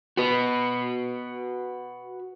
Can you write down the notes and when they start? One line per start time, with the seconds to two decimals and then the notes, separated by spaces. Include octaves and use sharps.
0.17 F#4 B4